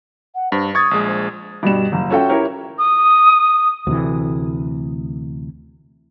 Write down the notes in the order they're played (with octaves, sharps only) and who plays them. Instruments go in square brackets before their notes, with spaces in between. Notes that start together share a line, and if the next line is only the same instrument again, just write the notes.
[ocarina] F#5
[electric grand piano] G2 [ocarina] C5
[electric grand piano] C#6 G#6 A6 [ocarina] D#6
[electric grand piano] A#1 G#3
[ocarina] C5
[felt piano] G2 B2 G3 E7
F#1
C#4 F4 F#4 A4 E5 G5
E4 G4 A#4 C#5
[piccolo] D#6
[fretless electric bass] D2 C3 E3